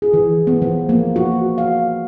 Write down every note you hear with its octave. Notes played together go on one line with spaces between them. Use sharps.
G#4
E3
B3
F3
A#3
F#4
F5